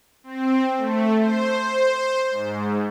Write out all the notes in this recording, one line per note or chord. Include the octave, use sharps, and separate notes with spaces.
C4
A3
C5
G#2